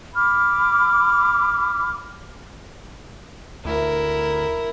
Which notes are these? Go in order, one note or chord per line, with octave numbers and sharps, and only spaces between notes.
B5 D6 F6
D2 E4 A#4